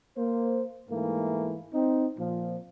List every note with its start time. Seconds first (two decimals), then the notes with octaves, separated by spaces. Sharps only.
0.17 A#3 C5
0.89 G#2 E3 A3 A#3
1.74 C4 D#4
2.18 A#2 F3